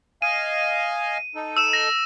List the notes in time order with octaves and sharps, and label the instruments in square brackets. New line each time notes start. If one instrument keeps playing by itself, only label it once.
[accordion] D#5 F5 G#5 [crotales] D#7
[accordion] D#4 A4
[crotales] E6 E7
A#6